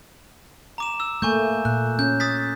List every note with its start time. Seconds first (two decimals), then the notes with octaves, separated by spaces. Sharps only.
0.78 A#5 D6 E7
1.00 E6
1.22 A3 A#3 G#5 C#6 G6
1.65 A#2 F#6
1.99 C#4 G6
2.20 D#6 A6 B6